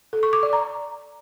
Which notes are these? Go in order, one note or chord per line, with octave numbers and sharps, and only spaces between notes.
A4
C#6
D6
D5
A#5